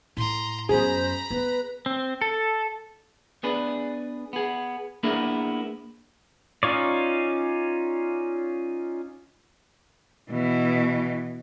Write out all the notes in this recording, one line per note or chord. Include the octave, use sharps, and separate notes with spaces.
A2 A#5 C6
F#2 B3 G#4 C5 A#5 B5
B3 B4
C4
A4
B3 D4 G#4 B4
B3 G#4
A#3 B3 D4 E4 G#4 A#4
C#4 D#4 F4 C#5 D5
B2 E3